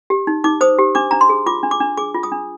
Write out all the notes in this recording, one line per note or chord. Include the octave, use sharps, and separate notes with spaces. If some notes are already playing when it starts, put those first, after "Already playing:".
G4
D#4
D#4 D6
C5 D#6
G4
D4 D6
D4 A#5
C6
G#4
F4 D6
D4
D6
D4
G#4 D6
F4
D#6
D4